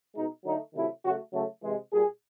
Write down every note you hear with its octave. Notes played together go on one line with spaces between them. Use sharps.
B2 G#3 D#4
D3 F#3 A3 D#4
C3 D#3 F#3 A3 E4
C#3 F#3 A3 F#4
C#3 F#3 A3
C3 E3 G#3
A#2 G3 G#4